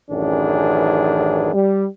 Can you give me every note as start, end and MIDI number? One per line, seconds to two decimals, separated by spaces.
0.11 1.52 33
0.11 1.52 42
0.11 1.52 51
0.11 1.52 52
0.11 1.52 62
0.11 1.52 68
1.54 1.86 55